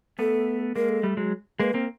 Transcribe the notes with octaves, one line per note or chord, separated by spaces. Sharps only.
A3 B3 A4
G#3 A#3 A#4
A4
G3 A3
F#3 G#3
G#3 A#3 B4
A#3 C4 A#4